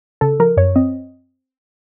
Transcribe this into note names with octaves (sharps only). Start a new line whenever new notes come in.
C#3 A4
F3 A#4
F#2 C#5
C4 D#5